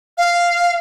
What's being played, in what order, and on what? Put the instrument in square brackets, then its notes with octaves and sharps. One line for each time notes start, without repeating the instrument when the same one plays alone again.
[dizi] F5